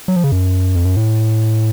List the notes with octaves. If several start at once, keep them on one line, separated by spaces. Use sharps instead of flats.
F#3
F3
C#3
F#2
F2
F#2
A2